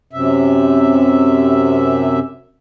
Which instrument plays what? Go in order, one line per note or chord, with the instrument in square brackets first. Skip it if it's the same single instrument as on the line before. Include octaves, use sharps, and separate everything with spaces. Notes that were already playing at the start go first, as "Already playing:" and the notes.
[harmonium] F#2 C3 E5